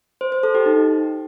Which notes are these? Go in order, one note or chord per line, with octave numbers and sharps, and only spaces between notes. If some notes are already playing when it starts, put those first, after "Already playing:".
C5
C5
A4
G4
D#4